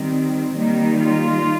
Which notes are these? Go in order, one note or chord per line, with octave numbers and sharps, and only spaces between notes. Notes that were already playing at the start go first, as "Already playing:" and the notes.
Already playing: D#3 G3 C4
D#3 G3 A#3 D#4
F4